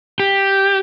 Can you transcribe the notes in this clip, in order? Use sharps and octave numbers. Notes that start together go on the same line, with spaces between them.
G4